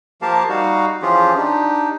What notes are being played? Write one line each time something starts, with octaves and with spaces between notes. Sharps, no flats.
F3 A#3 G4 A#4 F5 A5
G3 D#4 F#4 F5
E3 F3 C#4 F4 G4 G#4
D4 D#4 G4